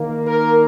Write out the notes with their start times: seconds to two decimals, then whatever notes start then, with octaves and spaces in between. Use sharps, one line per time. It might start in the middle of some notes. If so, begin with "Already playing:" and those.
Already playing: D#3 A#3
0.26 A#4